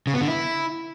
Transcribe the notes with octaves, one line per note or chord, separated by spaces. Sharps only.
C#3
B3
D3
E4